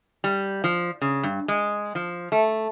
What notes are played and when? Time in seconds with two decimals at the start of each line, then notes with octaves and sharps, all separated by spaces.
0.24 G3
0.64 F3
1.02 C#3
1.23 G2
1.48 G#3
1.95 F3
2.32 A3